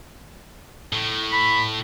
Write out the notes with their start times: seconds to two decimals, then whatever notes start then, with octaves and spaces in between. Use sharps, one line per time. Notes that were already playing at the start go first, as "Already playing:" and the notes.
0.93 A2
1.32 B5